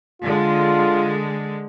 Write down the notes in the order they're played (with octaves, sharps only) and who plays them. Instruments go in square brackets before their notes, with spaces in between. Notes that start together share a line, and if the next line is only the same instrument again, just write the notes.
[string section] D3 G#3 [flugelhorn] F4